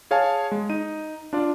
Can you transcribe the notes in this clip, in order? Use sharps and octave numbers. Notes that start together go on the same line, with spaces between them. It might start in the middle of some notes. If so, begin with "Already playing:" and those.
G#4 C#5 F5 G#5 A5
G#3
D#4 D#7
D4 F4 D5